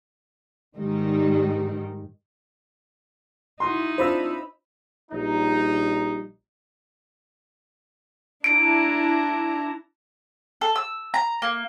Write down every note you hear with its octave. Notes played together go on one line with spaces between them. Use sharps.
G#2 D#3 G3 D#4
D#4 E4 F#4 C6
C4 D4 F4 C5 B5 E6
A#1 G3 D#4
D4 E4 A#5 D7
A4
E6
A#5
A#3